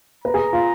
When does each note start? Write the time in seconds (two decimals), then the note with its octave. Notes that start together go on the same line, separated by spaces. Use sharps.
0.24 B4 A#5
0.34 G#4
0.53 F4